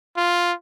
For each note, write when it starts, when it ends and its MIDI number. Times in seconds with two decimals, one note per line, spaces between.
0.17 0.53 65